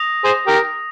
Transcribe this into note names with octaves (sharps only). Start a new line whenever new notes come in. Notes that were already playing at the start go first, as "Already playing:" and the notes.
Already playing: D#6 A#6 F7
G#4 C5
G4 A#4